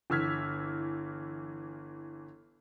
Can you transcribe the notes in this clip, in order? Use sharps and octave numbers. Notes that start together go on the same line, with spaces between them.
G1 E3 E6 F6 G#6 B6